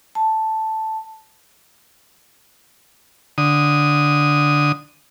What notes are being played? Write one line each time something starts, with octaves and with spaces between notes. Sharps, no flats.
A5
D3 D#6